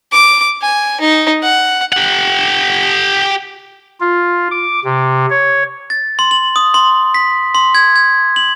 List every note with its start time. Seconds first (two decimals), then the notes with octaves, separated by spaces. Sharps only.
0.12 D6
0.62 G#5
1.01 D#4
1.43 F#5
1.93 G4 F#5
4.01 F4
4.51 D6
4.85 C3
5.30 C#5
5.90 A6
6.19 C6
6.31 F#7
6.56 D#6
6.74 C6
7.14 B6
7.55 C6
7.75 G#6
7.96 G#6
8.36 F#7